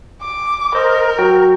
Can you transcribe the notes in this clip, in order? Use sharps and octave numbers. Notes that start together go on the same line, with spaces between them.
D6
A#4 C5 D#5
F#3 F#4 G5